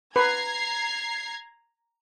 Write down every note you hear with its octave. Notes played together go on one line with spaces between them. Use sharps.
B4 A#5 G#6 C7